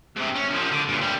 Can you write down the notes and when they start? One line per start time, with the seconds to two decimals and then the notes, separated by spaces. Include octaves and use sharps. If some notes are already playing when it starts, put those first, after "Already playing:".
0.16 G#2 C3
0.35 C#4
0.49 C2 F3
0.71 D3
0.88 G2 A#2
1.01 C3 G3